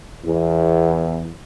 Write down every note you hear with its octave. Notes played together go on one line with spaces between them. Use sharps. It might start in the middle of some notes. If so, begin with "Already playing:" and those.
E2